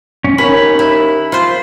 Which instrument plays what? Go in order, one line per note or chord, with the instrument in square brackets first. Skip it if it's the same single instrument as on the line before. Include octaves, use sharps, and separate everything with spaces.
[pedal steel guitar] C#4
[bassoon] D#2 [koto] C#4 [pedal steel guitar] B5
[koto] E4
[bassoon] F3 [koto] F4 C5